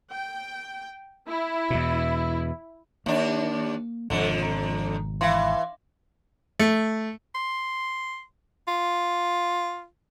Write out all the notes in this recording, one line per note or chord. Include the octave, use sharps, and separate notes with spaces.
G5
E4
E2 B2
D#2 A#3 D4
G#1 F2 B2 D3
A#5
E3 F5 C6
A3
C6
F4